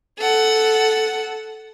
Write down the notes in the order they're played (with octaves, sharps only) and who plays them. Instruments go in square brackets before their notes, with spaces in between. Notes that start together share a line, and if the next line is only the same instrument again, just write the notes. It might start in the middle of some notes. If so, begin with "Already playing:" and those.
[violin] A4 F#5